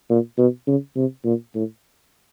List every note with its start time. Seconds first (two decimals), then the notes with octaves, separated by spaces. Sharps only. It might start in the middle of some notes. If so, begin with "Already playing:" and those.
0.09 A#2
0.38 B2
0.67 C#3
0.96 C3
1.25 A#2
1.55 A2